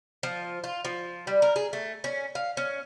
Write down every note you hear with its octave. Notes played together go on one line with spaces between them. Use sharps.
F3
F4
F3
G3
A#4
G#4
A3
C#4
F5
C#4